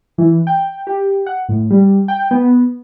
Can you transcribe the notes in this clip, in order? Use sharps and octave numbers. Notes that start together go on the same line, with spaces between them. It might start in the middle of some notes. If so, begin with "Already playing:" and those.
E3
G5
G4
F#5
A2
G3
G5
B3